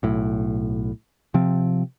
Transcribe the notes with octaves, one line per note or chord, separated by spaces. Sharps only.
B1 A2
C3 F3 C4